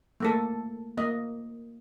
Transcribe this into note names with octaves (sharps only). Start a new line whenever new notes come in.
A3 A#3 A4
A#3 D#5